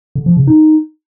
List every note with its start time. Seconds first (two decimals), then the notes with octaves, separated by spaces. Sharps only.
0.15 D3
0.26 F3
0.37 C#3
0.47 D#4